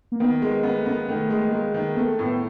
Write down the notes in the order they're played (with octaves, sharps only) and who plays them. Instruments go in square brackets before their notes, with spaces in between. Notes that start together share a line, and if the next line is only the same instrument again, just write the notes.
[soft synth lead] A#3
[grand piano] D#3 [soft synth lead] B3
[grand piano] G#3
[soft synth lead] A#3 [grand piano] B3
[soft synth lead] A3
[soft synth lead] A#3 [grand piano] B3
[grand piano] D#3 [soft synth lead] A3
[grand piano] G#3
[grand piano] G#3 [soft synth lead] A#3
[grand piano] D#3
[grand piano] A3 [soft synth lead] B3
[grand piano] A2 [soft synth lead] B3